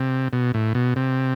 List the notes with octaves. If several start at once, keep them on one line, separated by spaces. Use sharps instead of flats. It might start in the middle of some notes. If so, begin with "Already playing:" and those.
Already playing: C3
B2
A2
B2
C3